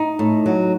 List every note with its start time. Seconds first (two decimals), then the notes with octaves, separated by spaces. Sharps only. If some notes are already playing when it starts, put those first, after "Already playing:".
Already playing: D#4
0.19 A2
0.46 F#3